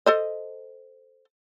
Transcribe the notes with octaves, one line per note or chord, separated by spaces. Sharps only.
A4 C5 D#5